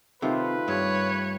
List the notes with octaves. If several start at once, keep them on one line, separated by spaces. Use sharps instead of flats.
C3 D#3 A3 F4 B4
G2 C#5